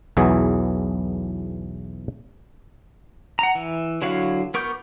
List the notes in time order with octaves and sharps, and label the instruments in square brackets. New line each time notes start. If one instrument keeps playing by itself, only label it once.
[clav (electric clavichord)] B1 E2 E3 F#3 G#4
[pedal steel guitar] F#5 A#5
E3
D3 F#3 E4 F#4 F5
B3 A#4 C#6 D6 G6